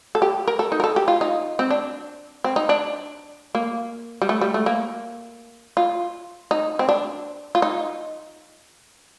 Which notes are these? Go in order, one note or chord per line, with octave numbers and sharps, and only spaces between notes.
A4
G4
A#4
A4
D#4
A#4
A4
G4
F4
D#4
C4
D4
C4
D#4
D4
A#3
G3
A3
G3
A3
A#3
F4
D#4
C4
D4
F4
D#4